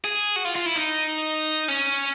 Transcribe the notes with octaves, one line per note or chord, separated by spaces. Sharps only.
G#4
F#4
F4
F4
E4
D#4
C#4